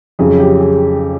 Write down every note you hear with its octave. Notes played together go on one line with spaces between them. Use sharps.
F2 C#3 F#3 G#4
G4
G#4